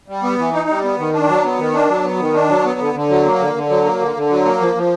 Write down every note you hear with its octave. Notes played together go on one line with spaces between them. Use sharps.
G3
B3
E3
D#4
G3
B3
D#3
D4
F#3
B3
D#3
D4
F#3
B3
D#3
D4
F#3
B3
D3
D3
F#3
A#3
D3
D3
F#3
A#3
D3
D3
F#3
A#3
F3
F3